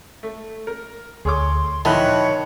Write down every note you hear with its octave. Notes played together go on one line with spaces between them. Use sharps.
A3
A#4
D2 G#4 C#5 C6 D6
A#1 D#3 E3 E4 C#5 A5 B5 F#6